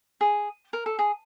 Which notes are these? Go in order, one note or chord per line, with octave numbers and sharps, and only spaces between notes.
G#4
A#4
A4
G#4